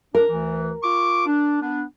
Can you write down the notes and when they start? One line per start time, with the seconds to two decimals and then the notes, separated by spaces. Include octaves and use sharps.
0.15 D4 A#4
0.28 D2 E3
0.83 F4 C#6 D6
1.26 D4
1.61 B3 D4